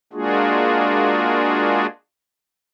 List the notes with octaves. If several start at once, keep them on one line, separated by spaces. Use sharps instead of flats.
G#3 A#3 D4 F4 F#4 G#4